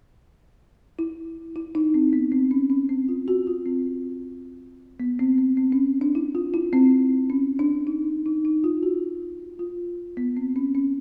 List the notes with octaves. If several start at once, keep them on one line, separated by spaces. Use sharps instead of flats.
E4
E4
D#4
C4
B3
C4
C#4
C#4
C4
F4
F#4
F4
C4
B3
C4
C4
C4
C#4
D4
E4
F4
E4
C4
C#4
D4
D#4
D#4
D#4
F4
F#4
F4
B3
C4
C#4
C#4